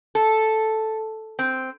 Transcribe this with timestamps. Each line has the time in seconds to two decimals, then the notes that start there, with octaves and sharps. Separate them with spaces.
0.15 A4
1.39 C4